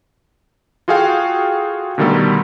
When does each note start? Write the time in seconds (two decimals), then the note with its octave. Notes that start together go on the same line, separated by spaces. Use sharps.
0.88 F4 F#4 G#4 A4 F5 G5
1.98 B2 D3 D#3 G3 A3 A4